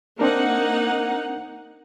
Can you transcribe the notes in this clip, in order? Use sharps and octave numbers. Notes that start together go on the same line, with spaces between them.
A#3 C4 D4 D#4 A#4 F#5